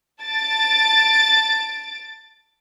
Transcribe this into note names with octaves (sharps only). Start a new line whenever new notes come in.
A5 A6 D7